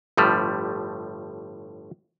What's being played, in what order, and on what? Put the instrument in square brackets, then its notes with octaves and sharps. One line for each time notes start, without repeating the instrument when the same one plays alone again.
[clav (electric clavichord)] G1 A2 F3 G3 A3